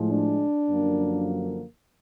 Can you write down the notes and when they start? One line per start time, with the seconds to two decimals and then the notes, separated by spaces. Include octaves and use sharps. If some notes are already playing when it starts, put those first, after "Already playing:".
Already playing: A2 F3 G#3
0.11 D4
0.69 F#2 D3 F3 A#3